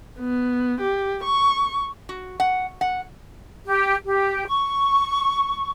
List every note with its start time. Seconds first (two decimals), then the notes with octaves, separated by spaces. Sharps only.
0.19 B3
0.81 G4
1.24 C#6
2.09 F#4
2.40 F#5
2.81 F#5
3.66 G4
4.06 G4
4.48 C#6